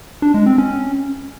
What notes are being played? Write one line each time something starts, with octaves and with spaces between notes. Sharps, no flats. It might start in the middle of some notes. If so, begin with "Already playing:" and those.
D4
G#3
C4
C#4